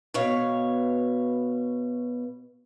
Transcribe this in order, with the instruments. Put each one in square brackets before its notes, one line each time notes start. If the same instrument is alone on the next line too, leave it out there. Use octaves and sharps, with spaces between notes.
[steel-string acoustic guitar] B2 B3 C#5 F5